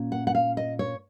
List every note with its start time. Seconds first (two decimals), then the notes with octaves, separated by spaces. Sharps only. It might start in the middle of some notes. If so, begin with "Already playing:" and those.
Already playing: A#2 C#4
0.12 F#5
0.27 F#5
0.35 F5
0.57 D#5
0.79 C#5